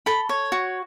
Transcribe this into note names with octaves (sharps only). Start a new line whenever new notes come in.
A4 B5
C#5
F#4